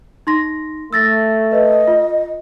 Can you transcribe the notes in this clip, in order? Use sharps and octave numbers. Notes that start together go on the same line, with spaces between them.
D#4 C6 A#6
A3 E6 A6 A#6
B4 D#5
F4